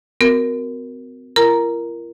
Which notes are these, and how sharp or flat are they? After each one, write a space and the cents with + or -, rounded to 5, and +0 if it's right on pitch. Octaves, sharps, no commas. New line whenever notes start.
C4 -45 F#4 +0 A#4 +0
F4 -45 A#4 +0 A#5 +5